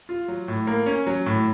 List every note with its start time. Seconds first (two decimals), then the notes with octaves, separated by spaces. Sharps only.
0.09 F4
0.28 F#3
0.48 A2
0.67 A#3
0.86 C#4
1.07 F#3
1.26 A2